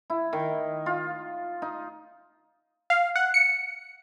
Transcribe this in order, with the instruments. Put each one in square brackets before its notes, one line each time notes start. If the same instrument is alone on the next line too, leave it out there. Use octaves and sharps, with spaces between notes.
[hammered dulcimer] E4
D#3
F4
D#4
[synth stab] F5
F#5
C#7